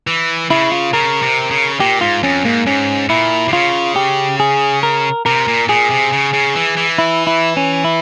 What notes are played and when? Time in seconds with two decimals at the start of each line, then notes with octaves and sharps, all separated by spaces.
0.07 E3
0.50 C#3 E4
0.72 F4
0.93 C#3 A#4
1.22 C3
1.51 C#3
1.80 A#2 G4
2.01 G#2 F4
2.23 F2 C#4
2.45 G#2 A#3
2.66 G#2 C#4
3.09 A#2 E4
3.48 C3
3.53 C#3 F4
3.96 G4
4.40 G#4
4.83 A#4
5.26 C3 A#4
5.48 A#2
5.69 A#2 G#4
5.90 C3
6.12 C#3
6.33 C#3
6.55 E3
6.77 E3
6.98 E4
7.27 E4
7.57 C#4
7.84 E4